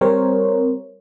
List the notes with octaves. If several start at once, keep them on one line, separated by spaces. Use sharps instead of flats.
G3 C4 A#4 C5 C#5